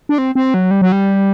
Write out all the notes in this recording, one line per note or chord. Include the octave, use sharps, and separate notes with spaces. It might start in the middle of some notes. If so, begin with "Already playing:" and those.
D4
C4
C4
F#3
G3
F#3
G3